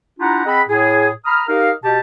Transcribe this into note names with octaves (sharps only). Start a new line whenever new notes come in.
D4 E4 F4 G4 F#5 A#5
C4 G#4 D#5 F#5 B5
A2 G#4
A#5 B5 D#6 F6
D#4 G4 A#4 D#5 F5
B2 G4 A5